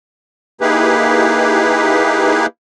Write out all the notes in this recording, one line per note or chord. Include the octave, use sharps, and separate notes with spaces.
A#3 D#4 E4 G4 G#4 B4